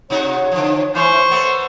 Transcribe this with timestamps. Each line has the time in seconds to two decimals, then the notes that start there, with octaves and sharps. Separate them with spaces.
0.10 C3 D#4 F#4 C#5
0.51 D3 F3
0.95 E3 C5 C#6
1.31 A3 B3